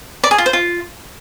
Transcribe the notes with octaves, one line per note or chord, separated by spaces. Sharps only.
D5
G#4
F4
C5
F4